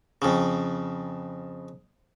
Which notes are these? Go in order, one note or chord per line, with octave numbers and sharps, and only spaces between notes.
F2 C#3